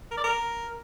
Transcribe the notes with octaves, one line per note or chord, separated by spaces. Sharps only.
A#4
D5
A#4